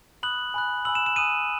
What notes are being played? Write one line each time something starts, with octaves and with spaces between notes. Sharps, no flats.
B5 D#6 F#6 F#7
G#5 B5 F#6
G#5 B5 E6 F#7
E7
E7
G#5 D#6 F#6 D#7